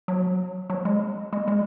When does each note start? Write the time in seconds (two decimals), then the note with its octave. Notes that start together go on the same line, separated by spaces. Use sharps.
0.08 F#3
0.70 F#3
0.85 G#3
1.33 G#3
1.48 G#3